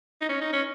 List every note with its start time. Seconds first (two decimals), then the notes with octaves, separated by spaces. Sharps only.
0.21 D#4
0.29 C#4
0.41 D#4
0.53 C#4